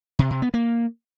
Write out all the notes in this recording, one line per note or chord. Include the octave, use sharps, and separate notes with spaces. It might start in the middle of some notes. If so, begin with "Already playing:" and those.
C3
C3
B3
A#3